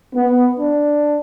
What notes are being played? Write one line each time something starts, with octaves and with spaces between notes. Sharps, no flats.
B3
D4